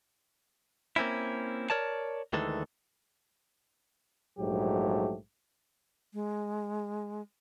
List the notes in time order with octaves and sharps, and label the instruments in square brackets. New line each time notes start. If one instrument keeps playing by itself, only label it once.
[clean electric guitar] A#3 C4 C#4 E4
A#4 C#5 D5 A5
D2 D#3 E3 G#3 A4
[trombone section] A#1 G#2 F#3 A3 G4
[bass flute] G#3